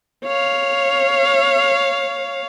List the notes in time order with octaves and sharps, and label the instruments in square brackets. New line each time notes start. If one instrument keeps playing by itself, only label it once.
[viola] C#5 F5